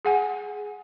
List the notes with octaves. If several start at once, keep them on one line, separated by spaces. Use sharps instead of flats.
G#4 F#5 G#5